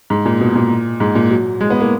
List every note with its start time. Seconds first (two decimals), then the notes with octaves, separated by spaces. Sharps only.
0.10 G#2
0.25 A#2
0.40 B2
0.55 A#2
1.00 G#2
1.15 A#2
1.31 F#3
1.61 G#3
1.70 B3
1.80 A#3